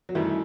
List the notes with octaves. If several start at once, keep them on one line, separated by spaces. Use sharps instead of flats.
F#3
F#2 D#3 E3 G3 A3